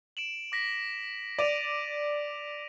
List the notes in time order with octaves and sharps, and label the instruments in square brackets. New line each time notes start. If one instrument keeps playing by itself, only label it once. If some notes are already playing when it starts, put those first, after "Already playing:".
[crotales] D7 E7 F#7
D6 A#6 B6
[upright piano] D5 [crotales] D7 D#7 F7